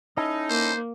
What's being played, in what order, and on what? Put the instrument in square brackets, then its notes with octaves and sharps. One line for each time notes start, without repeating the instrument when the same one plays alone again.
[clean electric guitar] C#4 E4 A4 [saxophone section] D#4
[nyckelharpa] A#3 [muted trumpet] C5